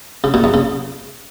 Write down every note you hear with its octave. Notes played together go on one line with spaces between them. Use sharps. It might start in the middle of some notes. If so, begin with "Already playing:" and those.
C#3
A#2
E2
C#3